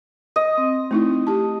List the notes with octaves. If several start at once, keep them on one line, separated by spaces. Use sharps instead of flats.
D#5 D#6
C4
A3 D#4 E4
G4 A5